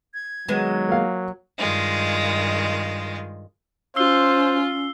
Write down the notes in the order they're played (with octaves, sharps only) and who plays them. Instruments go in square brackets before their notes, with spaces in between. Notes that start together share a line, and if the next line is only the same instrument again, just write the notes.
[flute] G#6
[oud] D#3 G#3 B3 [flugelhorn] F#3
[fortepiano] A#3 F5
[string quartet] G2 D#3 G#3 F4
[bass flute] C#4 [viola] F4 [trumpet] C5 [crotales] E6 C7 G7